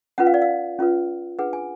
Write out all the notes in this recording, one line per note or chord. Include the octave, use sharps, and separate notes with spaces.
C#4 F4 B4 F#5
F5
D5
F5
C#4 F4 B4
D4 G#4 B4 F#5
G#5